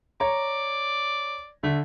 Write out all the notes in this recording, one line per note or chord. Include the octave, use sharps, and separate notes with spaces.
C#5 D5 A#5
D3 A3